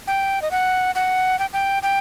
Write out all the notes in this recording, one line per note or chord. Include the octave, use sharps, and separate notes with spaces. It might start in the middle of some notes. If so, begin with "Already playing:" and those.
G5
D#5
F#5
F#5
G5
G5
G5